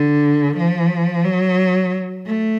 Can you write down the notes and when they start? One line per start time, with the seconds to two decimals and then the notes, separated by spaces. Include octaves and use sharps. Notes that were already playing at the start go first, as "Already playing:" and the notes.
Already playing: D3
0.57 F3
1.25 F#3
2.26 A3